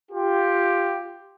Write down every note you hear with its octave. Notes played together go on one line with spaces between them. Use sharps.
F4 G4